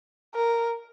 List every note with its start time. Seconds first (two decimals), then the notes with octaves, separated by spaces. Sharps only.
0.35 A#4